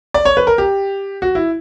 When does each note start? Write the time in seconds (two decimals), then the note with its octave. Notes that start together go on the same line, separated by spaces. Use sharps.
0.14 D5
0.25 C#5
0.37 B4
0.47 A#4
0.58 G4
1.22 F#4
1.35 E4